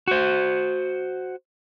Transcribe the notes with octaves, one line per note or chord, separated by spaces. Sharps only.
F#4 C5